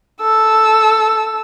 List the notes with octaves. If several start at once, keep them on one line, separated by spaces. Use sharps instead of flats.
A4 E6